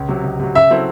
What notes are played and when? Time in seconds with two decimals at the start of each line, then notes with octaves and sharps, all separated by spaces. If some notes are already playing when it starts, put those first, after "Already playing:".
Already playing: C#2
0.08 C3 F#3
0.24 C#2
0.39 C3 F#3
0.55 C#3 E5
0.71 F#3 C4 E4 A4